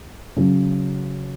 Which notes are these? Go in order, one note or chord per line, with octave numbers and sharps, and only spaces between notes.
C#3 F#3